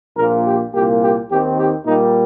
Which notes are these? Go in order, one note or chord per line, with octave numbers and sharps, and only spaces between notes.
A#1 A#2 A#3 A#4
G4
C2 A#2 A#3 G4
G4
D#2 D#3 C4 G4
G4
A#2 G3 A#3 D#4